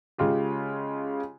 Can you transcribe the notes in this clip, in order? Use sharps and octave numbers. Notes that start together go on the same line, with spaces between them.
C#3 G#3 F4 G4